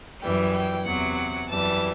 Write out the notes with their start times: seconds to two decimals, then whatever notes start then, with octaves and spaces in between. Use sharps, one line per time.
0.21 F#2 E3 G3 G5
0.53 G5
0.85 E2 C3 F#3 F#5
1.49 F#2 E3 G3 A5